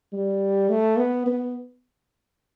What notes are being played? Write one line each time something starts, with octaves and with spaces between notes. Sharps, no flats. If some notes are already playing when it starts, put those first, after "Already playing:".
G3
A3
B3
B3